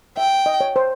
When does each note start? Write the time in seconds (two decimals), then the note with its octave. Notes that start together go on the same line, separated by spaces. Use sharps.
0.17 E5 G5
0.46 D#5
0.61 C#5
0.76 C5